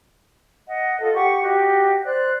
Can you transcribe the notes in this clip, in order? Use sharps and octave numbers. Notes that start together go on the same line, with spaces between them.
D#5 F#5
F4 A4 D#5
G4 F#5 C#6
F#4 G4 D#5
C5 D5 F#6